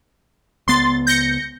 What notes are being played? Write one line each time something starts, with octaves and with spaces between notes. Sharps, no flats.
C#2 B3 C6 A6
G6 A#6 C#7